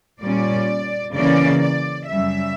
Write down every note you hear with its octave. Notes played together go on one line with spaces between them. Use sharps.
A#2 G3 C#4 D5
C#3 E3 A#3 C#4 D5
D5
F#2 C#3 G3 E5